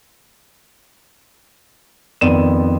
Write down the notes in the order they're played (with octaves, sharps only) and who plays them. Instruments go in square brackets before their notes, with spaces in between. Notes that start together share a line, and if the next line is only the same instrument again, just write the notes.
[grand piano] F2 D#3 B3 D5 D#7 E7